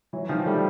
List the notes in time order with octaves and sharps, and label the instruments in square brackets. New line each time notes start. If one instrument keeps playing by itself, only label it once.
[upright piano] E3 F#3
D#3 F3
G3 A3